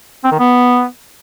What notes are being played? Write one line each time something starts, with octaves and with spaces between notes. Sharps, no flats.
C4
D#3
B3